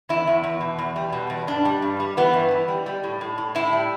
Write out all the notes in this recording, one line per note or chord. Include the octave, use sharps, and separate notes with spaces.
E2 E4
E2
E2
B2
E2
G3
B2
E2
G2 D4
G3
G2
G3
E3 B3
G2
E3
G3
G3
A2
A2
A2
A2 E4
G3